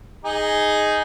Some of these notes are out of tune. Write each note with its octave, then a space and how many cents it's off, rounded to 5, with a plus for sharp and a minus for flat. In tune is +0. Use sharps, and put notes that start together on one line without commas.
D#4 +0 G#4 +0